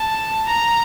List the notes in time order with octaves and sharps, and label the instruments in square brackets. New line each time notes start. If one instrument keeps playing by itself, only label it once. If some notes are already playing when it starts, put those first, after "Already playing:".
Already playing: [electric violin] A5
A#5